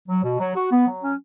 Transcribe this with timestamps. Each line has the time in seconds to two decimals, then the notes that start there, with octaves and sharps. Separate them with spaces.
0.08 F#3
0.24 B2
0.39 F#3
0.55 F#4
0.71 B3
0.87 F#3
1.03 C#4